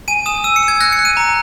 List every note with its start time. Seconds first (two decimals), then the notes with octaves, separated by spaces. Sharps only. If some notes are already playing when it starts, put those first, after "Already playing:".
0.08 G#5 D#7
0.26 D#6 E7
0.44 E6 D#7
0.56 C#7
0.63 E6
0.68 G#6
0.81 F#6 A#6
0.92 C#7
0.99 F#6
1.05 D#7
1.17 A#5